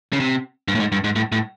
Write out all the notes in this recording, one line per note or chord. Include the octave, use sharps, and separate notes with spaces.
C#3
C3
G2
A2
G#2
G2
G#2
A2
A2